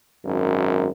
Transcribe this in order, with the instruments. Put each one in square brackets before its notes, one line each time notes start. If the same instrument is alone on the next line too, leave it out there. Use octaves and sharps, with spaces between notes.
[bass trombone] G#1 [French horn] F#2